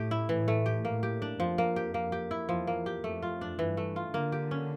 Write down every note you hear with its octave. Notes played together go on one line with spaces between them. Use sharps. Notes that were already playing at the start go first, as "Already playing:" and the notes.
Already playing: A2 A3 G4
E4
A2 E3
A3
G4
A2 A#3
G4
D4
F2 F3
A#3
G4
A#3
G4
E4
E2 F3
A#3
G4
F2 A3
F4
D4
G2 E3
A3
F4
D3 A#3
G4
C#4